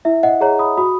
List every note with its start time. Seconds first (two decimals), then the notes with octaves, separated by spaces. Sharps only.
0.05 E4 E5
0.23 D#5 F#5
0.41 G#4 C#5 F#5 A#5
0.59 B5 D#6
0.78 F#4 B5 D#6